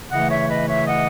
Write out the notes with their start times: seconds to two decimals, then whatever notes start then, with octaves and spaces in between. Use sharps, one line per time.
0.11 C#3 E3 A3 E4 D#5 F#5
0.30 C#5 E5
0.49 B4 D#5
0.68 C#5 E5
0.87 D#5 F#5